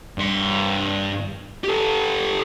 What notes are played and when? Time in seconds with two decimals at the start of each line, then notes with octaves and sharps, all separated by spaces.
0.18 G2 C6
1.64 G4 A4